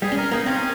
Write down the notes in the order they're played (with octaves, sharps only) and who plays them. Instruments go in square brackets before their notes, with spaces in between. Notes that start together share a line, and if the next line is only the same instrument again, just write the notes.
[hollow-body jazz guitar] G3 [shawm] G#4
[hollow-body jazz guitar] C#4
[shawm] A#4
[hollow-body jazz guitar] A#3 [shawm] D#4
[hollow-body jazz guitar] C4 [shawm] C#4